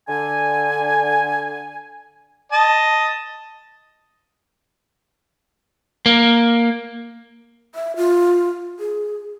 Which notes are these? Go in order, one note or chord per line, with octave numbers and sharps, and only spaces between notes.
D3 G#5
D#5 A5
A#3
E5
F4
G#4